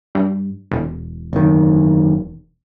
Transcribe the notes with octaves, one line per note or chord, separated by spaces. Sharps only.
G2
E1
F#1 D#3